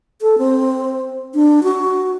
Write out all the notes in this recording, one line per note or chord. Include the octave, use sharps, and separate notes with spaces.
A4
C4
D4
F#4